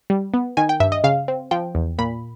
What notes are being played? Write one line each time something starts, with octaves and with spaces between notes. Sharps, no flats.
G3
B3
D#3 G#5
G5
G2 E5
D#5
C#3 F5
C4
F3 G5
E2
A#2 B5